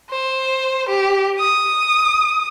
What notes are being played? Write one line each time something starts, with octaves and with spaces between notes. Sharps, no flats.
C5
G4
D#6